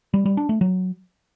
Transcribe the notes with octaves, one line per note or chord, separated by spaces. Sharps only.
G3
G3
D4
A3
F#3